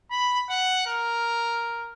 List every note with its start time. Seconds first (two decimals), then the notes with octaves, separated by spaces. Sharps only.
0.11 B5
0.49 F#5
0.87 A#4